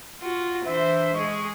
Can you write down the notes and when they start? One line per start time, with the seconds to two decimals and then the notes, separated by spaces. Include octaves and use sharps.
0.19 F4 F#4
0.65 E3 D4 C5 E5
1.13 G#3 G#4 D#5 C#6